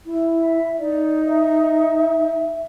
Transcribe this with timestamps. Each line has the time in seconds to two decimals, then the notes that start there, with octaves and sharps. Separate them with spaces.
0.06 E4
0.36 E5
0.79 D#4 D5
1.25 E5